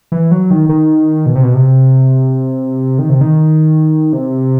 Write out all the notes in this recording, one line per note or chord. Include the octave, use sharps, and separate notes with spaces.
E3
F#3
D#3
D#3
B2
C3
B2
C3
D#3
C3
D#3
C3